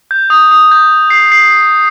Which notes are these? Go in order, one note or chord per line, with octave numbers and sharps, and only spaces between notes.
G6
D#6
D#6
G6
C7
C7